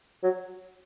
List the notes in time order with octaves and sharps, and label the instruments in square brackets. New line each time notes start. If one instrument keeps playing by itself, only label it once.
[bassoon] F#3